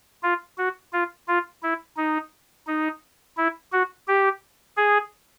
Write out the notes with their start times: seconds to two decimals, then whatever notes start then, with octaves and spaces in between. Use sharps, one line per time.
0.23 F4
0.58 F#4
0.93 F4
1.27 F4
1.63 E4
1.97 D#4
2.67 D#4
3.37 E4
3.72 F#4
4.07 G4
4.77 G#4